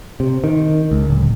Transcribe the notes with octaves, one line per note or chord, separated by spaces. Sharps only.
C3
D#3
C#2
D1